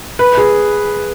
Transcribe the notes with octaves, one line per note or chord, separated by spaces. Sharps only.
B4
G#4